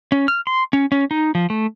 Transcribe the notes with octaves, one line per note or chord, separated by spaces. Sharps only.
C#4
F6
C6
C#4
C#4
D#4
F3
A3